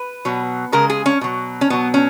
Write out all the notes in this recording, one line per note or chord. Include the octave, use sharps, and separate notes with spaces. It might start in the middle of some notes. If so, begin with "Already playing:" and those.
Already playing: B4
B2 F#3
C#3 G#3 A#4
G#4
C#4
B2 F#3
C#4
B2 F#3 B3
C#4